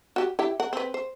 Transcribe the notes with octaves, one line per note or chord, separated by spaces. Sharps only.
F#4 G4
E4 G4
A#4 F#5
C4 B4
C5